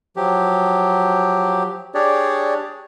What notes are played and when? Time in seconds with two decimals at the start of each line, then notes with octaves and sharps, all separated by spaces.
0.16 F3 F#3 G4
1.95 D4 G4 G#4 C#5 D5